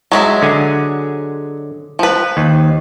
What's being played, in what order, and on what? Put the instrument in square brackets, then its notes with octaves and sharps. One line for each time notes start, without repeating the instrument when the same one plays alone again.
[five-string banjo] F#3 G#3 E5
[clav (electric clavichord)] D3 G#5
[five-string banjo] F3 B4
[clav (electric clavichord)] D#2